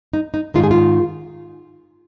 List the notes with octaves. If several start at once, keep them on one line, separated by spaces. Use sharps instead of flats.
D#4
D#4
G#2 D#3 G#3 F4
G#4
F4